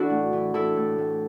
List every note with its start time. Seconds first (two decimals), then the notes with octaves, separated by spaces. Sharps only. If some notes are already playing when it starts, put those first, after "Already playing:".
Already playing: E3 D4 E4 F#4 A4
0.10 A2
0.33 E3
0.54 E3 E4 A4
0.76 A2
0.98 A2